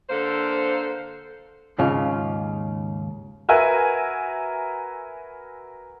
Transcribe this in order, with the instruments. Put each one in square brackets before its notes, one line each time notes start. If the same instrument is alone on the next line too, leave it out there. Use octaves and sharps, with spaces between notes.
[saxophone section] D3 A#3 A4 C5
[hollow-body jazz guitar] D#2 G#2 C#3 F4
[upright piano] F#4 A#4 B4 E5 G#5